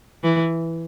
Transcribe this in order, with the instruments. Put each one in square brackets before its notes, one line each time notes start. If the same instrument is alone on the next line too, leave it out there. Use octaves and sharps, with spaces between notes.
[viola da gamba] E3